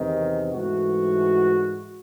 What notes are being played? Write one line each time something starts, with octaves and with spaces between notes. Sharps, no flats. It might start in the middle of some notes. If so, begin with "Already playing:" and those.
Already playing: E2 C3 D#3
G#2 E3 A3 F#4